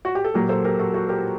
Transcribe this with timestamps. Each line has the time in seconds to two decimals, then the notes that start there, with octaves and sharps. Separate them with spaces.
0.05 F#4
0.15 G4
0.24 A4
0.34 A#2 F#3 G4 A#4
0.49 A4 C5
0.64 G4 A#4
0.79 F#4 A4
0.94 F#4 A4
1.09 G4 A#4